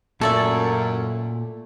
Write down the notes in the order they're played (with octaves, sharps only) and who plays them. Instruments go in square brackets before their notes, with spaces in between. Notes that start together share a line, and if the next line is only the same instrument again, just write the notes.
[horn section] F#2 [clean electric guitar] A#2 [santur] A3 [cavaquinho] A4 D5 E5